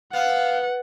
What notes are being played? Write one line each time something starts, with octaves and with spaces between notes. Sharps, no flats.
B3 F5 F#5